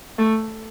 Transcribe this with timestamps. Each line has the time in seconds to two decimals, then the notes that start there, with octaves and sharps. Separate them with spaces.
0.18 A3